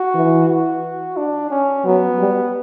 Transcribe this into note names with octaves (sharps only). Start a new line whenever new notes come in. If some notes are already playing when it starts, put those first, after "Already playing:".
Already playing: F#4
E3
F#4
D4
C#4
F#3 B3
G3